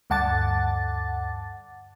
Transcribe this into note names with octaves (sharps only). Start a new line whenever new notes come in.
D2 G2 F#5 A5 D6 A6